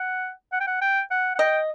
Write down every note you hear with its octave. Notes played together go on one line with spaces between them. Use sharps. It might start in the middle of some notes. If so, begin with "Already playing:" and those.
Already playing: F#5
F#5
G5
F#5
G5
F#5
F#5
D#5 G5